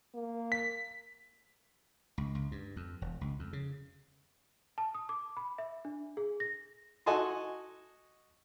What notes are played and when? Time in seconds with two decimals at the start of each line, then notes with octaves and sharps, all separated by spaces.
0.15 A#3
0.52 B6
2.18 C#2
2.35 C#2
2.51 G2
2.76 F2
3.02 E1
3.21 C#2
3.39 F2
3.53 C#3
4.78 A5
4.95 D#6
5.09 D6
5.37 B5
5.58 E5
5.85 D4
6.17 G#4
6.40 A#6
7.06 F#4 A4 D#5 G#5 A5 C6